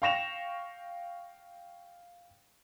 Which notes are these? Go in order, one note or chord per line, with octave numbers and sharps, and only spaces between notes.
F5 G5 C#6 A#6 E7 F7